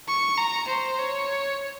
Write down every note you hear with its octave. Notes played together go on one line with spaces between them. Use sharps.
C#6
A#5
C5
C#5